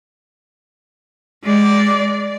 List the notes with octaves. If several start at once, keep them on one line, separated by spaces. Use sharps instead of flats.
G#3 D5